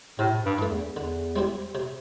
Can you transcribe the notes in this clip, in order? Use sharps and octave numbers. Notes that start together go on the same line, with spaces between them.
A2 C3
G2
E3 A3
E2
E2 D3
G3 C4 E4 G4
C3